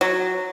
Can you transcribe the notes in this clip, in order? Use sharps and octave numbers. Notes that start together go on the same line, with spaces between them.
F#3